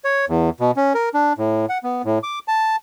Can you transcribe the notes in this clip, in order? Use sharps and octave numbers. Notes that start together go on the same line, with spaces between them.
C#5
E2
B2
C#4
A#4
D4
A2
F#5
B3
A2
D6
A5